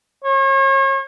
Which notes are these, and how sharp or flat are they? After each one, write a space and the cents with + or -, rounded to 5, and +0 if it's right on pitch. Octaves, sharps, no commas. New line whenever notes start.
C#5 -35